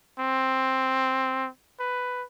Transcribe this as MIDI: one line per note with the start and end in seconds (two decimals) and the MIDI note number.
0.20 1.48 60
1.80 2.23 71